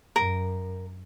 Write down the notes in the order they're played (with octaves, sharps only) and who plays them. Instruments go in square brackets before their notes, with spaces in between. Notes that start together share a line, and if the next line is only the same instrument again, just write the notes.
[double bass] F#2 [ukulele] A#4